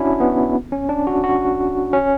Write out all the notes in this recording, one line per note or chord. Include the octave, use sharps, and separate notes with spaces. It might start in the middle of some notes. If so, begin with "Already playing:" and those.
Already playing: C#4 D4 E4 F#4
B3
C#4
D4
F#4
F#4
C#4